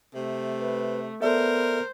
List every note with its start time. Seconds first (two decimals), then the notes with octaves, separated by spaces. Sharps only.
0.15 C3 A3
0.60 B4
1.22 B3 A4 A#4 C5 D5 E5